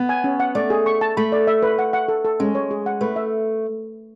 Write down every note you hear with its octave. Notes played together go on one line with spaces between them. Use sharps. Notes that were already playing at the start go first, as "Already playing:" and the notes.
Already playing: B3
G#5
C#4
F#5
A3 D5
G#4
C#6
A5
A3 B5
D5
E5
B4
F#5
F#5
A4
A4
G#3 C#4
C#5
G#4
F#5
A3 B4
E5